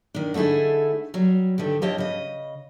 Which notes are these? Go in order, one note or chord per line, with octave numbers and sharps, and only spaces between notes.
D#3 D4
D3 A3 D#4 E4 G#4
F#3 G3
G2 D3 D#3 G4
F3 C4 G4 C#5 D#5 A5
C#3 D#5